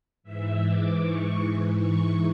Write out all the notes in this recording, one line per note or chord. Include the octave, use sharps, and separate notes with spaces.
G#2 E3 E5
D6
C#6
C#6